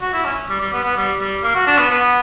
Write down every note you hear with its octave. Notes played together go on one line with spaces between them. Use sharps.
F#4
E4
C#4
G3
G3
B3
B3
G3
G3
A#3
F#4
D4
B3
B3